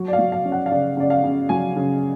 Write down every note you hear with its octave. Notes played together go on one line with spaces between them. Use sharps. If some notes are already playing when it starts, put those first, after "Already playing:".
Already playing: F#3
D5
F5
F#3
F5
C#4
F#5
F5
C#3 D5
C#3 D5
F5
C#3
F#3 G#5
C#3